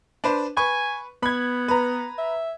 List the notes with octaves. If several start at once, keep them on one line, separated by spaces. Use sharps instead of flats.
D4 B4 C5
B4 G#5 C#6
B3 B5 G#6
B4 A#5
E5